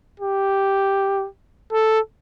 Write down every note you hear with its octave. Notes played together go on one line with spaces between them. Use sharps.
G4
A4